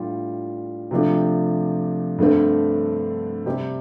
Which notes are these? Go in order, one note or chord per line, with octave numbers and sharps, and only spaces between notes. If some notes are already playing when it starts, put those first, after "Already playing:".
Already playing: A2 G3 D4 F4
C3 F3 A3 D4 G4
G2 D3 A3 C4
C3 G3 C4 G4